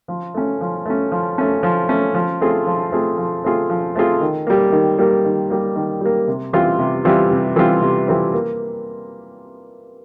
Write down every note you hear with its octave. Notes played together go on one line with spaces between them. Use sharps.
F3
A3 C#4
F3
A3 C#4
F3
A3 C#4
F3
A3 C#4
F3
A3 C4 F4 G#4
F3
A3 C4 F4 G#4
F3
A3 C4 F4 G#4
F3
A3 C4 F4 G#4
D#3
G3 A#3
D#3
G3 A#3
D#3
G3 A#3
D#3
G3 A#3
C3
E3 G3 C4 F4
C3
E3 G3 C4 F4
C3
E3 G3 C4 F4
C3
E3 G3 C4 F4
A#3